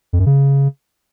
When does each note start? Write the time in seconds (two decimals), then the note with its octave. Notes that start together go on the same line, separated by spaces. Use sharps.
0.13 F2
0.19 F#2
0.26 C#3